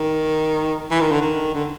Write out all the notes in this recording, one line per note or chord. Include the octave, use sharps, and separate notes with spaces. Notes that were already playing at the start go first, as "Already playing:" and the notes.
Already playing: D#3
E3
D#3
D3
D#3
D3